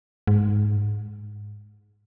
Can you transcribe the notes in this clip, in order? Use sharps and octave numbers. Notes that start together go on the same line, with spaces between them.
G#2